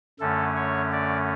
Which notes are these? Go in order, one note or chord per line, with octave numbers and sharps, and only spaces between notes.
F#2 D3 A3 C#4 A4
C#5
D5